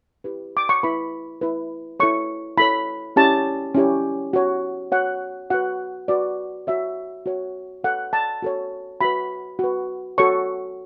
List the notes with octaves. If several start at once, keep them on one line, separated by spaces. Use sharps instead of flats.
E4 G4 B4
D6
C#6
E4 B4 B5
E4 B4
E4 A4 C#5 C#6
E4 A4 C#5 B5
C#4 E4 G4 C#5 A5
C#4 E4 G4 C#5
F#4 C#5
F#4 C#5 F#5
F#4 B4 F#5
F#4 B4 D5
F#4 C#5 E5
F#4 C#5
F#4 A4 C#5 F#5
A5
F#4 A4 C#5
F#4 B4 B5
F#4 B4
F#4 A4 C#5 C#6